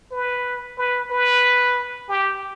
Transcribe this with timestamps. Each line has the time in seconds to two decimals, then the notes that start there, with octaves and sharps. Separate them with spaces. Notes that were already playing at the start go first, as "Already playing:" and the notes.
0.12 B4
0.78 B4
1.11 B4
2.09 G4